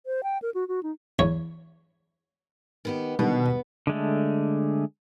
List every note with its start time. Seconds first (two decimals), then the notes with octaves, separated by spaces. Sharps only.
0.06 C5
0.23 G5
0.42 A#4
0.54 F#4
0.68 F#4
0.83 D#4
1.19 E2 C#5
2.85 D#3 B3 G4
3.19 B2 D3 D#3 G3 B3
3.87 D3 G#3 A3